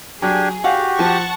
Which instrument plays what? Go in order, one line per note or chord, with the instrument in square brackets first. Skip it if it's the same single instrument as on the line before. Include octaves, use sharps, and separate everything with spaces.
[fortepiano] F#3 [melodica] D4 G4 G#5 [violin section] G#4
[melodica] F#4 G4 [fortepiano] F5 F#5
[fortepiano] F3 [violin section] F#5 A5 C#6